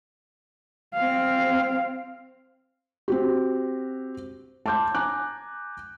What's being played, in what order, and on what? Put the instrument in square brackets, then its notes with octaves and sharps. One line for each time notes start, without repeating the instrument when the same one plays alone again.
[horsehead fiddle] C4 F5
[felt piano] C4 F#4 G4
A5 C6 D6 G6
G#5 A#5 D6 F#6